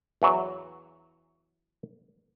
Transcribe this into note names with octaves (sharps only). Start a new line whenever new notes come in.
E2 E3 F#3